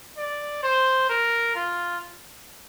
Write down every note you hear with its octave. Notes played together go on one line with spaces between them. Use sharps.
D5
C5
A#4
F4